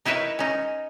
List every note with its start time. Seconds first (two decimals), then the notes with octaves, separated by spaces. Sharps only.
0.05 D#4 E4 A#4 B4 C#5 E5
0.39 C#4 D#4